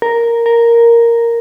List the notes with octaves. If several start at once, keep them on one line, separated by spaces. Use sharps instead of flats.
A#4
A#4